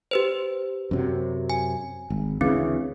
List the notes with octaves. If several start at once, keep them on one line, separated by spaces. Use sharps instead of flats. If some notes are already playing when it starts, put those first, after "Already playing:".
G4 B4 C5
F#2 C3 F#3
G#5
G#1
D2 C#3 E3 C4